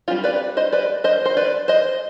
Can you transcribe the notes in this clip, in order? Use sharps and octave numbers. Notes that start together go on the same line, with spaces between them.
G3 C4 D#4 F4
B4 D5
C5 D#5
B4 D5
C5 D#5
C5
B4 D5
C5 D#5